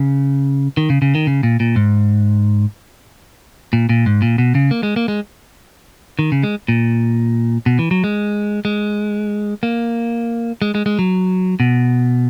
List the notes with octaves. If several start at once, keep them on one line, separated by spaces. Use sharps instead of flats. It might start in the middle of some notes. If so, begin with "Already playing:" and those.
Already playing: C#3
D#3
C#3
C#3
D#3
C#3
A#2
A#2
G#2
A#2
A#2
G#2
A#2
B2
C#3
A#3
G#3
A#3
G#3
D#3
C#3
G#3
A#2
B2
E3
F#3
G#3
G#3
A#3
G#3
G#3
G#3
F#3
B2